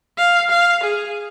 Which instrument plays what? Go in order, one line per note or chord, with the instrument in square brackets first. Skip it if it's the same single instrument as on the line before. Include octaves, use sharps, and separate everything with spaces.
[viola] F5
F5
G#4